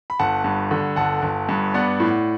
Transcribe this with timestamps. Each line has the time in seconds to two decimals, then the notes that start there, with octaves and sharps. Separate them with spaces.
0.10 B5
0.19 G1 F#5 A5
0.44 G2
0.71 D3
0.96 G1 F#5 A5
1.22 G1
1.49 G2
1.74 B3 D5 F#5
2.00 A2